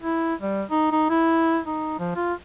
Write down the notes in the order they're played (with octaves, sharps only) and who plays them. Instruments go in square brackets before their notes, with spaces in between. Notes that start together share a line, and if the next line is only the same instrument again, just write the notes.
[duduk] E4
G3
D#4
D#4
E4
D#4
F3
F4